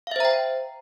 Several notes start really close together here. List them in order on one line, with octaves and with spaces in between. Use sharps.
F5 E5 C5 A#5 G5